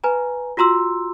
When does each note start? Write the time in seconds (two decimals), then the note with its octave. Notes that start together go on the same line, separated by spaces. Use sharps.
0.04 B4 G#5 A#5
0.57 F4 F#4 A#5 C6 E6